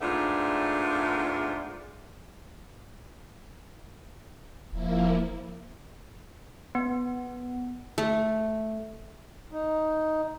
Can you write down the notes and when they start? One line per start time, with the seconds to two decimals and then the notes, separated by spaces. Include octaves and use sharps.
0.01 G#2 A3 B3 D4 F4
4.72 E1 F3 A#3 E4
6.75 B3
7.98 A3
9.52 D#4